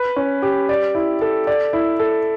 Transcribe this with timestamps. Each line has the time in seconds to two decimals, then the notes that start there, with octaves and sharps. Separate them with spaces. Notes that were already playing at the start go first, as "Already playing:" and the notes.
Already playing: B4
0.16 C#4
0.42 G4
0.69 D5
0.95 E4
1.21 A4
1.47 D5
1.73 E4
2.00 A4